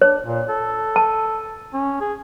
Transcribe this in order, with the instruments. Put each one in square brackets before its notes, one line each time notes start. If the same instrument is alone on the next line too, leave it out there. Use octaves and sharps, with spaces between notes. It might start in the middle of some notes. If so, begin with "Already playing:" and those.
[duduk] D4 [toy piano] C#5
[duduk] A#2
A4
[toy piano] A5
[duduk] C#4
G#4